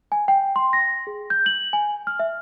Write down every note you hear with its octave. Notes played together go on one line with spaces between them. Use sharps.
G#5
G5
C6
A#6
G#4
G6
F#7
G#5
F6
E5